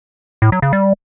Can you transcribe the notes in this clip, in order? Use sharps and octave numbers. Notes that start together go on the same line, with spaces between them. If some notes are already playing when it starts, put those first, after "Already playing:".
A2
F#3
C#3
G3